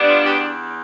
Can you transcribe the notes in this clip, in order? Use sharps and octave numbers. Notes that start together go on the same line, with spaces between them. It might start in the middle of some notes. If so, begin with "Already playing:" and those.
Already playing: G3 B3 D4
F4
E2 G4